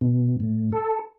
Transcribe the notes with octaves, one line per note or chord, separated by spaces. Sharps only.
B2
A2
A4